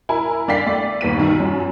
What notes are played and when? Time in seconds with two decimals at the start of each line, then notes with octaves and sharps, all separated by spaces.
0.09 E4 A#4 G#5 B5
0.48 D3 D5 F5 G5 B6 C7
0.66 A3 D5
1.01 D#2 B3 B6 D#7
1.18 B1 D#3
1.39 F#2 F3